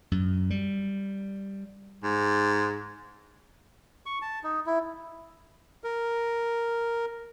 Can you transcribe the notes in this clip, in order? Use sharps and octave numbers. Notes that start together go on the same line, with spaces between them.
F#2
G3
G#2
C#6
A5
D#4
E4
A#4